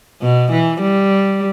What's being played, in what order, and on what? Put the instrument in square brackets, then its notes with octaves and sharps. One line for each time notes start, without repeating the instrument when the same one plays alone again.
[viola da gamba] B2
E3
G3